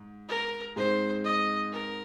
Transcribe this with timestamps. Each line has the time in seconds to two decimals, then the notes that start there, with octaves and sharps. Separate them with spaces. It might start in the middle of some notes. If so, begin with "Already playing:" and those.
Already playing: G#2
0.29 A#4
0.76 G#2 G#3 C4 D#4 G#4 C5
1.24 D#5
1.72 A#4